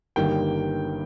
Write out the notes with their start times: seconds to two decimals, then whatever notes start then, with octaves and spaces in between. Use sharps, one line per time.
0.16 G1 G2 D#3 G3 A#3 G5